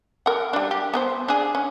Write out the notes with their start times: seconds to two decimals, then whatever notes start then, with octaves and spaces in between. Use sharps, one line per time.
0.26 A#4 F#5
0.53 G3 D4
0.71 G4
0.94 B3 A#4 C5
1.28 D4 G#4
1.55 C#4